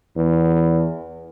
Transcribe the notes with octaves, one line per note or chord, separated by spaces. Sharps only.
E2